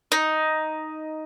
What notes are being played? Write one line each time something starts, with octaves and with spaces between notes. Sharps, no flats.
D#4